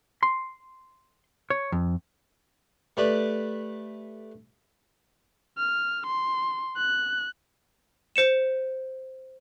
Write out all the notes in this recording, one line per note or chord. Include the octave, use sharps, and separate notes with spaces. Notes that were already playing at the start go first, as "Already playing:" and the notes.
C6
C#5
F2
A3 G4 B4 D5
F6
C6
F#6
C5 C#7 E7